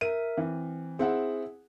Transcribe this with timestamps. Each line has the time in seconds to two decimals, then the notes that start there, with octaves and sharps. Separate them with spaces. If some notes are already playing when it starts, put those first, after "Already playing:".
0.01 A#4 E5 D#7
0.37 E3 C4
0.99 C4 E4 G#4 F#5